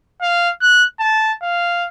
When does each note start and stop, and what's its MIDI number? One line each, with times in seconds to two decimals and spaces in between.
0.22 0.50 77
0.61 0.85 90
1.00 1.34 81
1.42 1.88 77